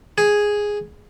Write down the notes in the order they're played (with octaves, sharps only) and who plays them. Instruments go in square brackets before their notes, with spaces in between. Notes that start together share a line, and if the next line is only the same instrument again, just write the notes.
[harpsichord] G#4